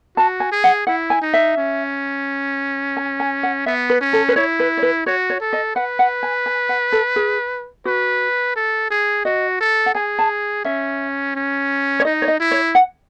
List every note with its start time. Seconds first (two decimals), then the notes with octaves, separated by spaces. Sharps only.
0.17 F#4 A5
0.40 G#5
0.52 G#4
0.64 F#5
0.87 E4 F#5
1.10 G#5
1.21 D#4
1.34 E5
1.57 C#4
2.97 G#5
3.20 G#5
3.43 F#5
3.66 B3 E5
3.90 B4
4.01 C#4
4.13 A4
4.29 B4
4.36 E4 C#5
4.60 B4
4.77 C#5
4.82 B4
5.06 F#4 C#5
5.30 C#5
5.41 A4
5.53 D#5
5.75 B4 F#5
5.99 F#5
6.23 G#5
6.46 G#5
6.69 F#5
6.92 A4
7.16 G#4
7.85 F#4 B4
8.56 A4
8.90 G#4
9.25 F#4 D#5
9.60 A4
9.86 F#5
9.95 G#4 G#5
10.19 A5
10.65 C#4 E5
11.35 C#4
12.00 C#5
12.05 D#4 D#5
12.22 C#5
12.28 D#5
12.40 E4
12.51 C#5
12.75 F#5